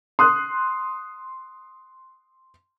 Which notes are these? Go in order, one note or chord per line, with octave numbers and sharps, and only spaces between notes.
C6 D#6 F#6